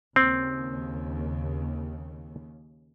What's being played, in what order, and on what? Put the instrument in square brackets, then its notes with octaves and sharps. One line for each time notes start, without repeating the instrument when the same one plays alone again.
[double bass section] D#2 C#3 [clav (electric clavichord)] C4